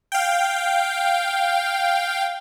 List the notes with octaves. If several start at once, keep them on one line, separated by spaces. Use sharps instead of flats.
F5 G5